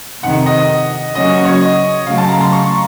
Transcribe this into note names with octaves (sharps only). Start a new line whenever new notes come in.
F2 C3 D#3 F#5
D#5
C#3 F#3 A#3 C#4 F#4 D#5
C#5
D#5
C#3 F#3 A3 F5
A5
A#5
C6
C#6